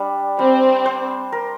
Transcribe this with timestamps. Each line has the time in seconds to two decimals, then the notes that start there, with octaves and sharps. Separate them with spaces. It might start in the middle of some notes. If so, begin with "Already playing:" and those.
Already playing: G3 D4
0.39 G3 C4
0.86 C5
1.32 A#4